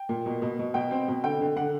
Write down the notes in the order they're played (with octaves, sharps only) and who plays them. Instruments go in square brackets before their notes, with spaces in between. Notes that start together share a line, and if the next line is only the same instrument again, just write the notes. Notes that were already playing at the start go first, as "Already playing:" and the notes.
Already playing: [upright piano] G5
A#2
B2
B2
B2
B2 G5
C4
B2
D3 G5
D3
D3 F#5